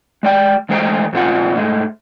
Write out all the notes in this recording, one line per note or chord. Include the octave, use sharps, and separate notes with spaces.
G#3 D5 G5
E2 G#3 A3 C5 G5 A#5
F2 A#2 C4 F4 F#5
G#2 G#3 A3